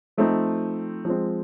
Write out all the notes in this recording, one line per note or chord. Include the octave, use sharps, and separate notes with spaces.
F3 A3 C4 D#4
F3 G#3 C4